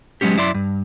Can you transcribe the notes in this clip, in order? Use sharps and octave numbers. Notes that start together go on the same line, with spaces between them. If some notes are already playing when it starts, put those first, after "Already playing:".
F#3 G#3 B3 C#4 G4
F#2 E4 D5 C6
G2